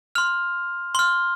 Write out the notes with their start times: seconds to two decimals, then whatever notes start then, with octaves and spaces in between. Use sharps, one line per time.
0.15 C6 F6 F7
0.95 C6 F6 G7